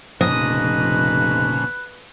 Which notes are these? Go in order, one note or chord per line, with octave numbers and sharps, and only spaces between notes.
F1 A#2 C#3 F3 B4 D#5